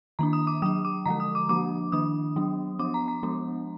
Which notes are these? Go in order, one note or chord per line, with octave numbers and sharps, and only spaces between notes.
D#3 A#3 D4 A#5
D#6
D6
F#3 D4 D#6
D6
D3 F3 G#3 A#5
D#6
D6
F3 A#3 D4 D6
D#3 A#3 D4 D#6
F#3 B3 D4
F3 B3 D4 D6
A#5
A#5
F3 G#3 B3 D4